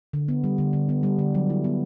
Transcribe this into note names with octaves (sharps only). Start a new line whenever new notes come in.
D3
B3
G3
D3
D3
B3
G3
D3
F#3
E4
B3